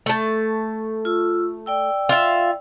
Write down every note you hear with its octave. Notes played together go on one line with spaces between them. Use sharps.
A3 A5
F4 E6
D5 G5 E6
F4 E5